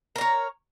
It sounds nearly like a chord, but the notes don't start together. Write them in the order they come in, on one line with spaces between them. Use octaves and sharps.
A#4 A#5 C#5